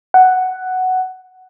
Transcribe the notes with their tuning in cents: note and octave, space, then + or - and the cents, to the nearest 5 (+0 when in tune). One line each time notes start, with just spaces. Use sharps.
F#5 +5